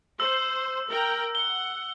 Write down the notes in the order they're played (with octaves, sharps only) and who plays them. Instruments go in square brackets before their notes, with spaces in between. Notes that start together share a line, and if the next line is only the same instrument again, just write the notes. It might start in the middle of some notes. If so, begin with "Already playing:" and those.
[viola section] C5 [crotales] E6
[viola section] A#4 G5
[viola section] F#5 [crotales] G7